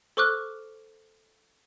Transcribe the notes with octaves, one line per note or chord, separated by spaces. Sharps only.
A4 C5 C#6 D6 F6 F#6